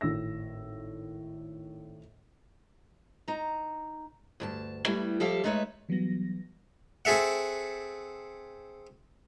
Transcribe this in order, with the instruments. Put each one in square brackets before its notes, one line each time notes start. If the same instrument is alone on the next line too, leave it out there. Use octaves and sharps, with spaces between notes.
[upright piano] G#1 A2 E6 A#6
[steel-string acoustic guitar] D#4 A#5
D2 G2 A5
G3 A3 B3 E4
F3 G3 G4 A4 E5 F5
G#3 A3 D#4 B4 C#5 E5
[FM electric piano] E3 F#3 G3 B3 A#6
[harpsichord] C4 G#4 A4 E5 F#5